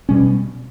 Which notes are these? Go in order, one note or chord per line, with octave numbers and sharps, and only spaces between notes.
B2 G3 C#4